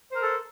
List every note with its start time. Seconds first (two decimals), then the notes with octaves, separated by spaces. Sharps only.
0.11 C5
0.16 A#4
0.20 A4